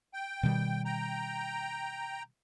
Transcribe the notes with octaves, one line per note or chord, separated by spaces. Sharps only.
G5
B2 D#3 G3
G5 A#5